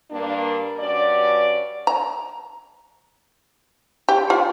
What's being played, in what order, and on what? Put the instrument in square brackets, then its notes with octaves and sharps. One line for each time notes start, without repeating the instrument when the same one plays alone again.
[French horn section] G2 A#3 D4
G2 C#4 F#4 D5
[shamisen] A#5
G4
F4